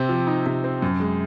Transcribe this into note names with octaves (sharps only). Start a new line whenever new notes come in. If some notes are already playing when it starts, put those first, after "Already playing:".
Already playing: C3 C4
F3
D#4
C3
C4
F#2
G#3